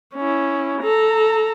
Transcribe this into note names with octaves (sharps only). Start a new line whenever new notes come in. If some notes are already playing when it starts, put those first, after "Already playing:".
C#4 E4
A4 A#5